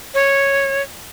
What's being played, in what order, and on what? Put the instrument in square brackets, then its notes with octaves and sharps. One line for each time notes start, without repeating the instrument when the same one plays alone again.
[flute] C#5